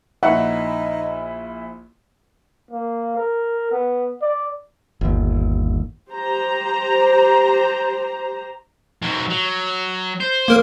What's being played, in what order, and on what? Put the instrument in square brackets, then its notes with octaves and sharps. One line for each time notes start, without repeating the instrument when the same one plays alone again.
[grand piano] A#1 E4 [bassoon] D#4 [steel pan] F#5
[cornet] A#3
A#4
B3
D5
[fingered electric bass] G1 D#2
[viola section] G4 C5 A#5
[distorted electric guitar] G#2 F#3
F#3
C5
[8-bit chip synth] A#3 A#4 F6